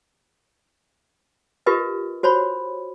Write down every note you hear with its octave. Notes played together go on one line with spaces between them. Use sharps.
F4 G4 A#4 B4 D#5
F#4 C5 C#5 B5